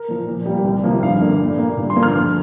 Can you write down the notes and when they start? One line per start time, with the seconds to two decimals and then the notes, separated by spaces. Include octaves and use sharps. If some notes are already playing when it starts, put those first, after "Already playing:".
Already playing: A#4
0.08 A#2 F3
0.27 A#2
0.46 G3 A#3
0.64 C2
0.84 C3 F3 A#3
1.02 G2 F5
1.21 D3 A#3
1.40 A#2
1.58 A#3
1.77 G2
1.90 C6
1.96 D3 F3 A#3
2.03 F6
2.16 D2